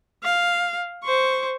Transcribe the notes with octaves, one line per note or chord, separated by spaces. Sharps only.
F5
C5 C#6